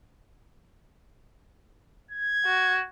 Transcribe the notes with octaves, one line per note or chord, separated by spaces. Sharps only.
G#6
F#4